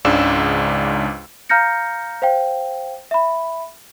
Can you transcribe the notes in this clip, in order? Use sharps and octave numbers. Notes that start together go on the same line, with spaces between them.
C#2 G#2 C#3 D4 E6 E7
F5 A#5 F6 G6 A#6 C#7
C5 F5 G5
E5 B5